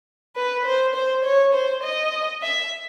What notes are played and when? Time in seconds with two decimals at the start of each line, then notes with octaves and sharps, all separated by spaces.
0.36 B4
0.65 C5
0.95 C5
1.25 C#5
1.53 C5
1.84 D#5
2.43 E5